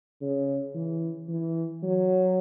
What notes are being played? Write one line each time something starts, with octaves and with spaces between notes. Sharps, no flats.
C#3
E3
E3
F#3